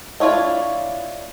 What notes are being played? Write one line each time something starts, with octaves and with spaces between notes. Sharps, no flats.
D4 E4 F4 C#5 D#5